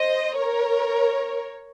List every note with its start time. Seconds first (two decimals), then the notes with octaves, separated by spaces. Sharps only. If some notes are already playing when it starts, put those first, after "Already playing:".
Already playing: C5 D#5
0.37 A#4 C#5